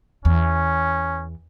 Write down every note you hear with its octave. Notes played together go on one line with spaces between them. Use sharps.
E2 C#4